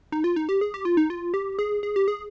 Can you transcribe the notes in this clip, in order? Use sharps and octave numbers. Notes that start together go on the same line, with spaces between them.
D#4
F4
D#4
G4
G#4
G4
F4
D#4
F4
G4
G#4
G#4
G4
G#4